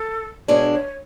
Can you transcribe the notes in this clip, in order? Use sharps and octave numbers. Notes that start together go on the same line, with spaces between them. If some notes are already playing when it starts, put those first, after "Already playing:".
Already playing: A4
B2 G#3 D4 C#5
C#5